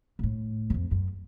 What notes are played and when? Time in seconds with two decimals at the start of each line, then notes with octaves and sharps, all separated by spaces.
0.19 A#2
0.23 A2
0.70 F#2
0.74 F2
0.91 F#2